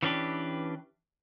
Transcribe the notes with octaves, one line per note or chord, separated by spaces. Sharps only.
E3 B3 C#4 D4 G4 B4